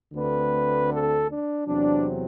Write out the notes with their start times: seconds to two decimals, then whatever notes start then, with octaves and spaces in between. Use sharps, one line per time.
0.14 D2 D3 A3 C4 B4
0.90 A4
1.28 D4
1.66 E2 C3 F#3 C4 D4